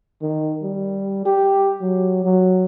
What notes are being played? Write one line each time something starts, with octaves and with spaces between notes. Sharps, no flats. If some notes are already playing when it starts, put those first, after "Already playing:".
D#3
G3
G4
F#3
F#3